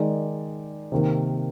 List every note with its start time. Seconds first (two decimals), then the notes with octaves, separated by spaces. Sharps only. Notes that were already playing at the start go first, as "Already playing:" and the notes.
Already playing: D#3 G#3 D#4 G#4 D5
0.92 C3 D#3 A#3